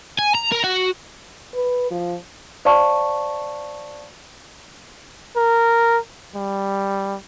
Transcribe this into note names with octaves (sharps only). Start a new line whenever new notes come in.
G#5
A#5
A#4
F#4
B4
F3
C5 D5 F5 A5 C#6
A#4
G3